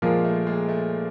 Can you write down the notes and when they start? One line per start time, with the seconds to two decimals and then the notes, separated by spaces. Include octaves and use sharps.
0.02 A#2 F3 G#3 A#3
0.24 A3
0.47 G#3
0.68 A3